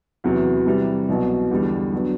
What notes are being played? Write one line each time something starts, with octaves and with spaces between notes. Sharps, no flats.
E2 C3 F#3 B3
C3 E3 G3
C2 B2 F#3
E2 D3 G3
F#3 B3 D4